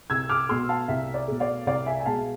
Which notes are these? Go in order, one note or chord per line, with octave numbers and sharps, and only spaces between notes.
C2 E6 G#6
D6 F6
B2 A3 C6 E6
F5 A5
C2 E5
D5
B2 A3
D5 F5
C2 D5 F5
E5 G#5
G#5
B2 G#3 F5 A5